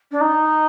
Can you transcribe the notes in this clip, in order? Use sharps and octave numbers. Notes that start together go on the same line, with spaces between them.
D4
D#4